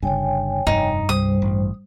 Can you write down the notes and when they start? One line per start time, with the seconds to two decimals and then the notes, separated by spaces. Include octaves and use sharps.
0.03 G1 G2 C#3 C#5 G5 G#5
0.67 F1 G2 D#4
1.09 C2 G3 C5 D#6
1.42 A1